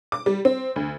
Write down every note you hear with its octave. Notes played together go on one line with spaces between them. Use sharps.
D6
G3
C4
D2